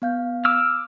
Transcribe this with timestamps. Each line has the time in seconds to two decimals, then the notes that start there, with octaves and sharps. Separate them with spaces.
0.02 B3 F5 G6
0.45 D6 E6 F6